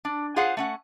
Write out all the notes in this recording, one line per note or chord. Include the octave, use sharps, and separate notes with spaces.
D4
F4 G#4 C5 F5 F#5
A3 C#4 F#5